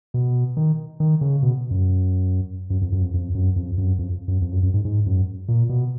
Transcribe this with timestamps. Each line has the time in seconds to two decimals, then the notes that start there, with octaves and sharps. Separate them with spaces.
0.14 B2
0.57 D#3
1.00 D#3
1.21 C#3
1.43 B2
1.71 F#2
2.70 F#2
2.81 F2
2.92 F#2
3.02 F2
3.14 F2
3.35 F#2
3.56 F2
3.78 F#2
3.99 F2
4.28 F#2
4.42 F2
4.52 F#2
4.63 F#2
4.74 G#2
4.85 G#2
5.06 F#2
5.48 A#2
5.69 B2